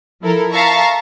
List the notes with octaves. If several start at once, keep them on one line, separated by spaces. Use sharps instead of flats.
F3 E4 A4 A#4
E5 F5 A5 A#5 C#6